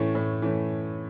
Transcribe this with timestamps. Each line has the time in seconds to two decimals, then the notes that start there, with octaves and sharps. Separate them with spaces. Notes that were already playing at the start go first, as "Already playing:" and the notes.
Already playing: A2 E3 A3 C#4
0.15 A2
0.42 E3 A3 C#4